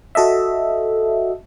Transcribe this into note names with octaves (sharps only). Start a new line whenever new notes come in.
F#4 A4 D#5 E5